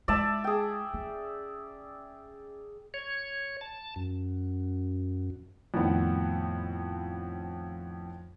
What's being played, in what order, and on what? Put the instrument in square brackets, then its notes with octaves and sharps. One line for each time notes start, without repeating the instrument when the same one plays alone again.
[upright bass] G#3 F4 [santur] D5 E5 A5
[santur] G#4 G5
[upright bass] C#4
[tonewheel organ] C#5
A5
F#2
[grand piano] F2 A2 D#3 B3